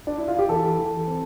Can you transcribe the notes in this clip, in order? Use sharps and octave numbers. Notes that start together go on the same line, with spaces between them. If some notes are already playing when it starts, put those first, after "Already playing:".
D4
E4
F4
G4
E3 A4
E3
C4